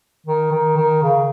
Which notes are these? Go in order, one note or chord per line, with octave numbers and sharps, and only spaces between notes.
D#3
D#3
D#3
C#3